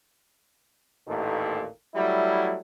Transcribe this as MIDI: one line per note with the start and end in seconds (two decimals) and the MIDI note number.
1.07 1.67 33
1.07 1.67 39
1.07 1.67 46
1.07 1.67 51
1.07 1.67 69
1.95 2.58 54
1.95 2.58 55
1.95 2.58 57
1.95 2.58 64